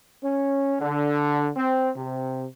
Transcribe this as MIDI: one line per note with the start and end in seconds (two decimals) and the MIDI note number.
0.23 0.74 61
0.80 1.49 50
1.56 1.89 60
1.96 2.46 48